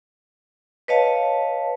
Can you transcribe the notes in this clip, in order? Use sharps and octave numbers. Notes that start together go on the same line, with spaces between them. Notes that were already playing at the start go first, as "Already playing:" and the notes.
B4 C#5 D#5 F5 A5